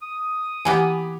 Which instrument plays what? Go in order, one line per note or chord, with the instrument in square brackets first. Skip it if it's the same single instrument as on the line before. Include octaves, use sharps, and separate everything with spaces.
[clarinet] D#6
[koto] E3 A#3 B3 [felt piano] G4 F#5 G#5